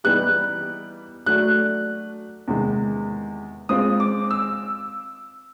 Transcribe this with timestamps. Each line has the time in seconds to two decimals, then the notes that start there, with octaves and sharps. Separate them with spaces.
0.04 E3 G3 B3 D#4 G4 F#6
1.26 F#3 A3 D4 F#4 F#6
2.48 E2 C3 D#3 G#3
3.69 G#3 C4 F4 D#6
4.00 D6
4.31 E6